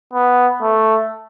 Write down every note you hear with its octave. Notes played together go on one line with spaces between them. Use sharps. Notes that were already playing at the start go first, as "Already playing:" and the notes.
B3
A3